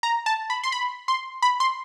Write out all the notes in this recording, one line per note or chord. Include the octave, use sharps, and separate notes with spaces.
A#5
A5
B5
C6
B5
C6
B5
C6